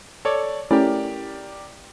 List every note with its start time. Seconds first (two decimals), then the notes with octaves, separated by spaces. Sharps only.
0.25 A4 C#5 D5
0.71 A3 C#4 E4 G4 A#4 D5